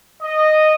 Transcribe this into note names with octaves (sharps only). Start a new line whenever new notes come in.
D#5